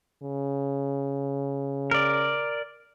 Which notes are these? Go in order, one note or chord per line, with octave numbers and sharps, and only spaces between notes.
C#3
A#4 D5